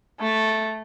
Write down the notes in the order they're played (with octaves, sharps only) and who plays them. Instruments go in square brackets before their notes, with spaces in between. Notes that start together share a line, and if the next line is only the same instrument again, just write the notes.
[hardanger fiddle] A3